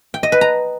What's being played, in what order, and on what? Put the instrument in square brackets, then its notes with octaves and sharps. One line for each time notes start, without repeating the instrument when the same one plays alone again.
[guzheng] G5
D#5
B4
A#5